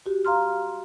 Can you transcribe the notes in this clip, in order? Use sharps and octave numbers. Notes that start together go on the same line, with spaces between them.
F#4 G4
F5 A#5 C6 F6